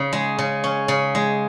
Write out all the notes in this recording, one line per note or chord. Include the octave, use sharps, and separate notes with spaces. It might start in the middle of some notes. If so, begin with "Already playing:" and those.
Already playing: C#3
G#3
C#3
C#4
C#3
G#3